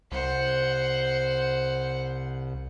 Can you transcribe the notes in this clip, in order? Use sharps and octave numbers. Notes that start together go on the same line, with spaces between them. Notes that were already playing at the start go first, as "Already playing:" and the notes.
C2 C5 F#5